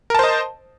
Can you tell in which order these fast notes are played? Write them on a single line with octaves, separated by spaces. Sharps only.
A#4 A5 C5 D#5